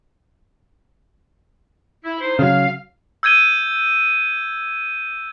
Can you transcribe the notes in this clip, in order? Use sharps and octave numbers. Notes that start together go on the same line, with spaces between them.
E4
D#4 E4 C5
C#3 F#3 F5
E6 G6 G#6 D#7 G7